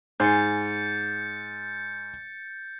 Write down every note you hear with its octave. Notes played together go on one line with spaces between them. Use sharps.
G#2 G#5 C6 G6 A6 C#7